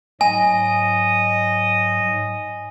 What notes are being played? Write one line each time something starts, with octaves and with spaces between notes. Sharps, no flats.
G#2 F#3 D#5 G#5